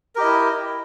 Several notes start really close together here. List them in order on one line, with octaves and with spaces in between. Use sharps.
A#4 G4 D#5 E4